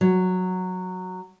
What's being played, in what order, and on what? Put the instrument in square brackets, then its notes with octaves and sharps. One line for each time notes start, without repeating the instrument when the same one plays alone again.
[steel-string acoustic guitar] F#3